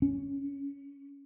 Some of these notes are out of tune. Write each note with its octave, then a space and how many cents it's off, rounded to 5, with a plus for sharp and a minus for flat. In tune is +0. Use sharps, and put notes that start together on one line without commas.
C#4 +15